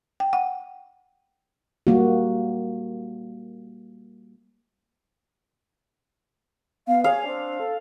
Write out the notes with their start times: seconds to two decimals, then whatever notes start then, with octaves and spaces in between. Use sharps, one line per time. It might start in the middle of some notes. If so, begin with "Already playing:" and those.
0.20 G5
0.33 F#5
1.87 G3 A#3 F#4
6.87 B3 F5
7.04 G#4 C#5 F5
7.25 C4 D4
7.60 A4